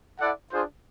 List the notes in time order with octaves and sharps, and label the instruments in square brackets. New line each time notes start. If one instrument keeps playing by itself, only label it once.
[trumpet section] E4 A4 D5 F#5
D4 F4 G#4 C5